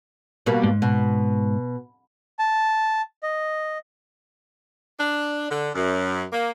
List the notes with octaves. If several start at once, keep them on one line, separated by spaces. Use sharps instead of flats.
B2 G3 A#3
G#2
B2
A5
D#5
D4
D3
F#2
A#3